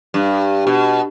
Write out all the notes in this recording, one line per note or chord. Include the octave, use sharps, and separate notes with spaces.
G2
B2